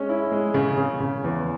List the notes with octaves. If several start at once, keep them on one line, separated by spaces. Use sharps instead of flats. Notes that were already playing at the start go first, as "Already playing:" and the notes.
Already playing: G#3 C#4
E4
G#3
C#3
C#3
C#3
E2